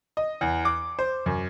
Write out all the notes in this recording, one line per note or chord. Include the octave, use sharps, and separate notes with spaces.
D#5
E2
D6
C5
F#2